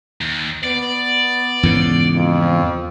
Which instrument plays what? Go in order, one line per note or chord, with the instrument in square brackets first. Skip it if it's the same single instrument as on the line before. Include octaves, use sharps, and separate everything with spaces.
[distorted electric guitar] D#2
[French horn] B3 [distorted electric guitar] D5
[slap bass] E2 G#2 C#3
[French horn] F2